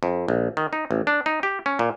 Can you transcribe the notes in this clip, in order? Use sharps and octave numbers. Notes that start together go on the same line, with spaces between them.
F2
A#1
D#3
D#4
A1
D4
D#4
G4
C#4
A#2